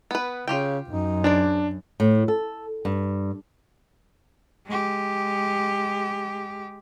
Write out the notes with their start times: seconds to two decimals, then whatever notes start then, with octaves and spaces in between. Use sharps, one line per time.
0.11 B3 B4
0.48 C#3 F4 G4 G5
0.88 F#2 D#4
1.24 D4 G#4 C5 D5
2.00 A2
2.28 A4
2.85 G2
4.66 G#3 G4